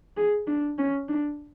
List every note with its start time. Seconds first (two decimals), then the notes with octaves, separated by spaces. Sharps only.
0.17 G#4
0.47 D4
0.78 C#4
1.09 D4